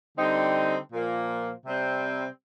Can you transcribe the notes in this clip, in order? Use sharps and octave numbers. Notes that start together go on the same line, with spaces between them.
D3 G3 C4 D#4
A#2 F3 A#3
C3 G3 C4